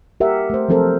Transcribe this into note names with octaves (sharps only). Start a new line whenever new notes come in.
G4 A#4 E5 F#5
A3 C5
F3 F#3 C4 A4 A#4 C5